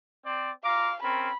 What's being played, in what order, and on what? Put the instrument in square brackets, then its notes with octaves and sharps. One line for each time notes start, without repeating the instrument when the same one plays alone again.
[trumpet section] C4 C5 D5
[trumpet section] F4 A#5 D6 [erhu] F5
[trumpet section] C4 C#4 A#4 [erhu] B5